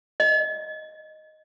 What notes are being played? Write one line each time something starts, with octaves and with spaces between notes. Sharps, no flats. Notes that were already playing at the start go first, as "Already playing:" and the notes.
D#5